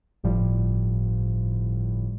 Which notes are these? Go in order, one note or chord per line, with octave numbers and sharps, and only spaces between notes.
G1 A2 F3 G3